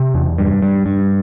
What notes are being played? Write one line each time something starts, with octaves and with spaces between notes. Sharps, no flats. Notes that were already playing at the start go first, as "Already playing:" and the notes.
Already playing: C3
E2
G2
G2
G2